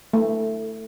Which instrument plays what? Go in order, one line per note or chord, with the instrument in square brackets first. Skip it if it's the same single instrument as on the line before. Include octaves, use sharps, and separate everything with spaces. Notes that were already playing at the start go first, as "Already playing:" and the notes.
[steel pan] A3